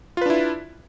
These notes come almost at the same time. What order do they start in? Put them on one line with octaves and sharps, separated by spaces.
F4 B4 D4 E4